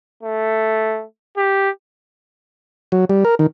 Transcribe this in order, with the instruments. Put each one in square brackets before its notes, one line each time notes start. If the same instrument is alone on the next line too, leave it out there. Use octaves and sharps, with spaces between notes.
[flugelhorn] A3
G4
[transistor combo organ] F#3
G3
A#4
D#3